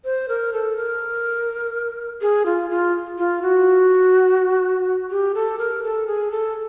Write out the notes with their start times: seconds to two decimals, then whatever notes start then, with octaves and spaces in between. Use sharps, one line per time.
0.05 C5
0.29 A#4
0.53 A4
0.77 A#4
2.21 G#4
2.46 F4
2.70 F4
3.18 F4
3.42 F#4
5.11 G4
5.35 A4
5.59 A#4
5.83 A4
6.07 G#4
6.31 A4